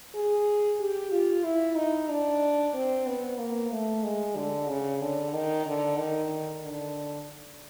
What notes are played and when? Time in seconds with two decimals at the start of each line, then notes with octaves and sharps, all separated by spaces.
0.14 G#4
0.80 G4
1.11 F4
1.44 E4
1.76 D#4
2.09 D4
2.74 C4
3.07 B3
3.38 A#3
3.71 A3
4.04 G#3
4.36 D3
4.69 C#3
5.01 D3
5.33 D#3
5.66 D3
5.98 D#3
6.63 D3